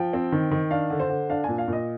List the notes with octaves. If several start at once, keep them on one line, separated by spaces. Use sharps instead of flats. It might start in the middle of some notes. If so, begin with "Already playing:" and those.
Already playing: F3 G5
C4
D#3
D#3
D4 F5
D3
C5
D3
D4 F5
A#2 G#5
F5
A#2 D#5